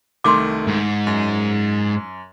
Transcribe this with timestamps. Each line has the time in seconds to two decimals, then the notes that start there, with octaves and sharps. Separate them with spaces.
0.24 C2 D#3 A3 C6 D6
0.67 G#2
1.07 F#2